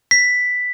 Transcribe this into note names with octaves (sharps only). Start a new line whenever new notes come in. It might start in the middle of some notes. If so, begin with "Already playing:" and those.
B6